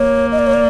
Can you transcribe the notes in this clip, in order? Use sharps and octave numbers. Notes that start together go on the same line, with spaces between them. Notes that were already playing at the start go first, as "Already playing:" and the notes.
Already playing: A#3 C#5
D#5
D5
C#5
D5